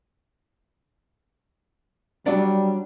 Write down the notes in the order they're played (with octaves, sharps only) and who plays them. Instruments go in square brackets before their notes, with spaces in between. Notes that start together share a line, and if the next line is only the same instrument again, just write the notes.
[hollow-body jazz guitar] F#3 D4 [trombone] G3